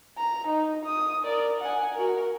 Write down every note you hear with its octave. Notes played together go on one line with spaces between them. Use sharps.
A#5
D#4
D#6
A#4 D5
F#5 G#5
F#4 A#4